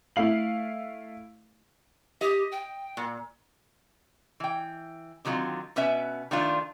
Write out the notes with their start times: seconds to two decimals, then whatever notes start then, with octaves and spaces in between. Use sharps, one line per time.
0.16 A3 E4 F5 F#7
2.21 G4 D#5
2.52 G5
2.97 A#2
4.40 E3 G5
5.25 D3 D#3 F#3 G3 C4 F4
5.76 B2 C#4 B4 E5
6.31 D#3 F3 A3 D4 F4